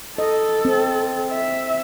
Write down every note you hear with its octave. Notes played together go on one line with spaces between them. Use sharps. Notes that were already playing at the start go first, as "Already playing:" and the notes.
A4 D#5
C4
E5